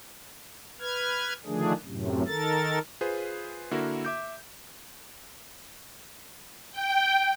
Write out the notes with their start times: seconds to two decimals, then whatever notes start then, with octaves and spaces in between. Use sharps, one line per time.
0.80 B4 F6 G#6
1.46 D3 D#3 F3 A3 D4 G#4
1.86 F#2 A2 C3
2.26 D#3 A4 A#4 A6
3.01 F4 G#4 B4 C5
3.71 D3 A#3 E4 F#4 A#4
4.05 E5 D6 G6
6.72 G5